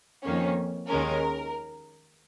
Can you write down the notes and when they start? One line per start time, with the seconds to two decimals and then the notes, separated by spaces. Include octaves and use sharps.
0.24 F2 D#3 A#3 C#4
0.88 D#2 D#3 G#3 C#4 A#4